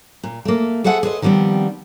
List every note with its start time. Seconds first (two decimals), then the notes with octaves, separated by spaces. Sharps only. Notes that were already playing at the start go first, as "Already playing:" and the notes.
0.23 A#2
0.45 A3 A#3
0.84 G#4 A4 C5 E5 F#5 G#5
1.03 G#4 B4 C5 D#5
1.22 D#3 F3 G3 B3 C4